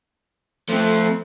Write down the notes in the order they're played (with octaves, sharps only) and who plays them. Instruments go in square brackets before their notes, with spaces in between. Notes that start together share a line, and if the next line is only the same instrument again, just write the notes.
[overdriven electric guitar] F3 C4 [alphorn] A3